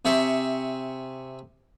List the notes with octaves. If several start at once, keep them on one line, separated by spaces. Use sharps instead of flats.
C3 G#4 E5 C#6